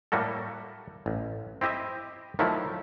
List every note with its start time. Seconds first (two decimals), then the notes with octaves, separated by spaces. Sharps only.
0.12 A2 G3 A#3 F#4 A4
1.06 A1
1.61 C4 E4 G4 D#5 E5
2.39 D#3 F3 F#3 A3 E4